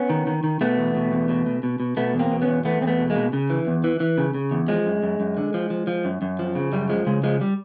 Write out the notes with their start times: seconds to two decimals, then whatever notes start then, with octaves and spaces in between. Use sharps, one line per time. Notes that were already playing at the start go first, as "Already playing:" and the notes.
Already playing: B3 C#4
0.10 D#3
0.27 D#3
0.44 D#3
0.61 B2 A3 B3
0.78 E2
0.95 B2
1.12 E2
1.29 B2
1.46 B2
1.63 B2
1.80 B2
1.97 B2 A3 B3
2.14 E2
2.19 A#3 C4
2.31 B2
2.42 B3 C#4
2.48 E2
2.65 E2 A3 B3
2.81 E2 C4
2.87 A3 B3
2.99 B2
3.10 G#3 A#3
3.16 B2
3.33 C#3
3.50 E3
3.67 E2
3.84 E3
4.00 E3
4.18 C#3
4.34 C#3
4.51 E2
4.68 F3 G#3
4.86 F#2
5.03 F#2
5.20 F#2
5.37 D3
5.54 F3
5.70 F3
5.87 F3
6.05 F#2
6.22 F#2
6.39 F3
6.55 C#3
6.73 F#2 G3
6.89 F3 G#3
7.06 C#3 G#3
7.23 F3 G#3
7.41 G3